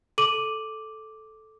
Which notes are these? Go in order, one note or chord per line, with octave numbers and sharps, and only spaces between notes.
A4 D6 D#7 F#7